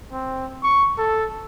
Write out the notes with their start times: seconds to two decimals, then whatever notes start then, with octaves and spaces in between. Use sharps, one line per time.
0.12 C4
0.63 C#6
0.98 A4